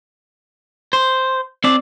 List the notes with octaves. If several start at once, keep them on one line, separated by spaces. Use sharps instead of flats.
C5
C4 D5